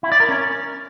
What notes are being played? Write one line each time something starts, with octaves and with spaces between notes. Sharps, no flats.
E4
D5
A#4
C#4